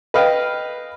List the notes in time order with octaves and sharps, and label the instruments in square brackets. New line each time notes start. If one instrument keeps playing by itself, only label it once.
[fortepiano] B4 D#5 F5 G5